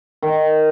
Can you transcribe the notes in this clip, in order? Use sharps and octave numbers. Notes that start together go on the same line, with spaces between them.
D#3